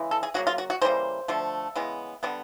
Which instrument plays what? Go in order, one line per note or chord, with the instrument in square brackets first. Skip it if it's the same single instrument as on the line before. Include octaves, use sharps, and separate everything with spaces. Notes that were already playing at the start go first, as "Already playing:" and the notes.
Already playing: [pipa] C#3 E3 G#3
A4
G#4
C#3 F#3 A#3 F#4
F4
F#4
F#4
C#3 E3 G3 A#3 C5
D3 F3 A3
C#3 E3 G#3 B3
D3 G3 B3